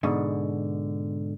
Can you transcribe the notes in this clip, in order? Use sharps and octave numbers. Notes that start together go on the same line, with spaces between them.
G#2 B2 D3